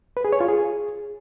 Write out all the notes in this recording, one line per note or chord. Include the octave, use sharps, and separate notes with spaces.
B4
G#4
C#5
F4
G#4